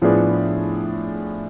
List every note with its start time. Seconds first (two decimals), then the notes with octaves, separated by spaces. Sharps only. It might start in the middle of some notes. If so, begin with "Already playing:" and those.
0.02 A2 F3 B3 D4 G#4